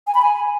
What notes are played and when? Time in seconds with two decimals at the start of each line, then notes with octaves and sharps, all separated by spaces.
0.07 G#5
0.15 B5
0.22 G#5